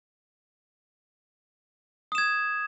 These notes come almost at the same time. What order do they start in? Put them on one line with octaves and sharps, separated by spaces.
D#6 E7 G#6